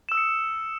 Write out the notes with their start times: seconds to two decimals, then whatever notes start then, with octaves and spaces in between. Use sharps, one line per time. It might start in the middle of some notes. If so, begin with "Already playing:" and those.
0.09 E7
0.12 E6
0.15 D#6
0.17 C#7